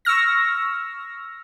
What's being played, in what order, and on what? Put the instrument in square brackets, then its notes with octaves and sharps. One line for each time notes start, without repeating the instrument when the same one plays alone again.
[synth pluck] C#6 E6 F6 A#6